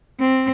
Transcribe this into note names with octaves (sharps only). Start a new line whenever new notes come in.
C4